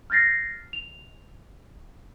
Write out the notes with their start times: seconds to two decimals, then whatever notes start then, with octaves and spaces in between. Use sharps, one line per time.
0.10 F6 G6 A6 A#6 C7
0.73 F7